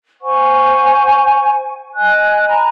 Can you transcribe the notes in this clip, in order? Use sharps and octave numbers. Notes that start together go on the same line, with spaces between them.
C5 F#5 G#5 C#6
D#5 G#5 F#6
A#5 B5